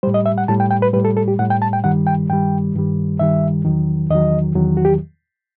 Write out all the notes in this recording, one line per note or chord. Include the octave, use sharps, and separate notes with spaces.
A2 G3 C5
D#5
E5
F#5
A2 G3 A5
G5
G5
B4
A2 G3 B4
A4
A4
G4
A2 G3 F#5
G5
A5
G5
G2 D#3 G3 F#5
G5
G2 D#3 G3 G5
G2 D#3 G3
G2 D#3 G3 E5
E2 D#3 F#3
E2 D#3 F#3 D#5
E2 D#3 F#3
F#4
G4